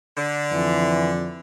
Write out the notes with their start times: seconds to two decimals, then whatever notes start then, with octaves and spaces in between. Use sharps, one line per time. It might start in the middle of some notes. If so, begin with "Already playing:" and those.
0.17 D3
0.52 F2 E3